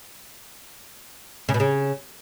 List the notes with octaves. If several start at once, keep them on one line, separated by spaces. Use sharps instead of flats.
C#3
B2
C#3